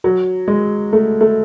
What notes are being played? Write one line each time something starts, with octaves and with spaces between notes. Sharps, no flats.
F#3
G#3
A3
A3